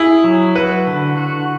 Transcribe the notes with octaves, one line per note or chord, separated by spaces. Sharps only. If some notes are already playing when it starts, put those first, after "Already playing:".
Already playing: E4 G#4
F#3
F#4 B4
D3
F#4